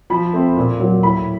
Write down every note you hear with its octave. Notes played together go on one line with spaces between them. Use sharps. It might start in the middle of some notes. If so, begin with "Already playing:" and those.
F3 B5
A3 C4
A#2
F#3 A#3
A2 B5